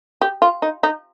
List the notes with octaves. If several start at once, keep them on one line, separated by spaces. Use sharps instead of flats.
G4
F4
D#4
D#4